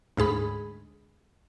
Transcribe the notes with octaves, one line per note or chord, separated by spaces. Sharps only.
D2 G#2 G#4 B5